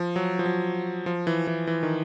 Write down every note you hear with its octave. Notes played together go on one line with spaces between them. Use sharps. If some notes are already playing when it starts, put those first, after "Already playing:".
Already playing: F3
F#3
F3
F#3
F3
E3
E3
E3
D#3